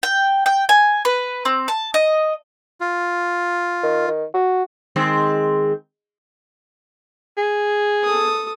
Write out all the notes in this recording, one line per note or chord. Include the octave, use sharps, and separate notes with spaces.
G5
G5
G#5
B4
C4
A5
D#5
F4
D#3
D#3
F#4
D#3 G#3 C4
G#4
A4 D#6